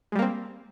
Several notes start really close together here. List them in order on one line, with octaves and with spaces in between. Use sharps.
G#3 G3 A#3 C4